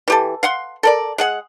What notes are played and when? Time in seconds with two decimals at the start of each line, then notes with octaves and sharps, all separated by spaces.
0.08 E3 G4 A4
0.43 F5 F#5 C6
0.83 A4 A#4 D5
1.18 G#3 G#4 F#5